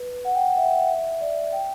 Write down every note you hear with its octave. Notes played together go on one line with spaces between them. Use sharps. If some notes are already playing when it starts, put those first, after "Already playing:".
Already playing: B4
F#5
G5
F#5
E5
D5
G5